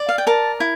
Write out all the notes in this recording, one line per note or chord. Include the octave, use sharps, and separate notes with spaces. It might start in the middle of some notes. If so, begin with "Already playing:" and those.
Already playing: D5
F5
G5
A#4 A5
E4